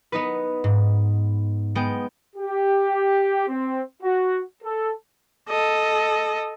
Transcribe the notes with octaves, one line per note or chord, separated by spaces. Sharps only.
B3 D#4 B4
G#2
G#3 B3 G5
G4
C4
F#4
A4
A4 D#5